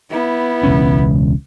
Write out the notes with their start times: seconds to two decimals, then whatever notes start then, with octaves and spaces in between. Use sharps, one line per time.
0.11 B3 E4
0.63 E1 C#2 C#4